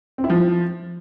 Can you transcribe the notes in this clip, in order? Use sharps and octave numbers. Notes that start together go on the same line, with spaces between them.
C4
E4
F3